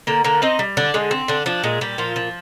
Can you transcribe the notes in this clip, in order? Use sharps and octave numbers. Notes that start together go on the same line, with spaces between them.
D3 A#3 A#4
D3 A#3 A#4
C4 D#4 D#5
G3
D3 D4 D5
D3 G#3 G#4
C4
D3 D4
F3 D4
A#2 G#3 G#4
A#2 G3 G4
A#2 F3 F4
F3